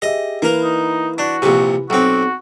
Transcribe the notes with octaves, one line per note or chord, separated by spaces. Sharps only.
G4 G#4 D#5 E5
E3 A#3 A#4 B4
D#4
D4 F#4
A#1 C3
B1 C4 F#4 F#5